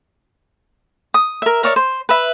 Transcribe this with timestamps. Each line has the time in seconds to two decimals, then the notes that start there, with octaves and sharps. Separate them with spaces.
1.14 D#6
1.42 A#4 E5
1.63 A#4 C#5 D5 E5
1.76 C5
2.09 B4 E5